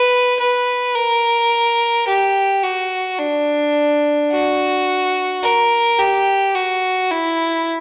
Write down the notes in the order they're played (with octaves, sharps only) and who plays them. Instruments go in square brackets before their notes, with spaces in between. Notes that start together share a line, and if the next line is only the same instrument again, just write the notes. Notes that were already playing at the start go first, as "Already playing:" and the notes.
Already playing: [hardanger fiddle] B4
B4
A#4
G4
F#4
D4
F#4
A#4
G4
F#4
E4